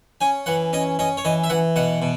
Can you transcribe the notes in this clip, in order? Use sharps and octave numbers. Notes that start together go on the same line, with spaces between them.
C#4 G#5
E3 F#5
C#4 D#5
C#4 D#5
C#5
E3 D#5
E5
E3 F#5
B2 F#5
B2